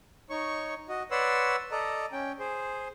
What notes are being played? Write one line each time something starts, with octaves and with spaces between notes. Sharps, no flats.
D#4 C#5 C#6
F#4 D#5
B4 C#5 D5 F#5 C6 E6
A4 D5 D#5 A#5
C#4 G5
G#4 C5